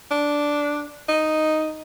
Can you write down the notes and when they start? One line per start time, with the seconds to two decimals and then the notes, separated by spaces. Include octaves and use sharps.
0.11 D4
1.09 D#4